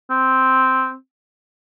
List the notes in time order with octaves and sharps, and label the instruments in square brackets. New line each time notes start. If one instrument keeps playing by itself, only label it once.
[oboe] C4